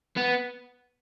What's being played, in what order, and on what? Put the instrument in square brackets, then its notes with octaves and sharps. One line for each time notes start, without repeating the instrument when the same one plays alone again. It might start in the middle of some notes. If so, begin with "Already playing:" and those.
[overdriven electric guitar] B3